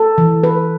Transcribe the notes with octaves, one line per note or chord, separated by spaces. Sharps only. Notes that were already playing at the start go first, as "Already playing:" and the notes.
Already playing: A4
E3
B4